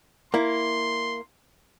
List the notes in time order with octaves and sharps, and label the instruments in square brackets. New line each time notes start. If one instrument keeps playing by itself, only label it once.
[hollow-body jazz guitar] A#3 E4 [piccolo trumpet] C6